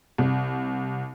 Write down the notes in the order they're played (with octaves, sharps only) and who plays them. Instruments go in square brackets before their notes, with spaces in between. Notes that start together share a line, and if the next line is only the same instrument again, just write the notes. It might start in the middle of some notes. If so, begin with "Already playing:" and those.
[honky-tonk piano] C2